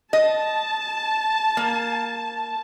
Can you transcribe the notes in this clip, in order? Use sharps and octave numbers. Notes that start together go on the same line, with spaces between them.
D#5 A5
A#3